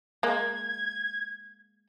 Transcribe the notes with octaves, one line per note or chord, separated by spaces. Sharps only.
G#3 A#3 G#6